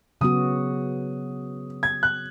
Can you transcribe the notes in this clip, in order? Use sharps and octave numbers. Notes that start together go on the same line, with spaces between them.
C#3 F#3 B3 F#4 D#6
G#6
F#6